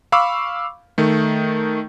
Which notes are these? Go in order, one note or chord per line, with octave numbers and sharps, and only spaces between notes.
F5 B5 C#6 D6 E6
D#3 A3